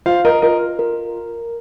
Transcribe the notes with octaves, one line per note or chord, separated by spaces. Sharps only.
F4 C5 F5
A#4 D#5
F4 A#4 D#5
A#4